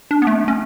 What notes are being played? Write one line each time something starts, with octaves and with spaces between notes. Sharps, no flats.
D4
B3
A3
C#4